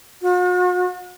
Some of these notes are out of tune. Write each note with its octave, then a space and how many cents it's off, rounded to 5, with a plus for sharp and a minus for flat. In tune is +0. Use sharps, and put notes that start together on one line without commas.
F#4 -45